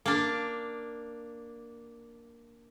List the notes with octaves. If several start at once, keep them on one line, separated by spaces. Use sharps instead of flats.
A#3 D4